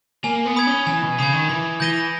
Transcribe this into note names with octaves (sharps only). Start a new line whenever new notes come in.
A#3 G#5
B3
B5 D#6 G#6
C#4
E3 G#5
B2
C#3 B5 D#6 G#6
D#3
E3 B5
E3 G6 A#6 D#7 G7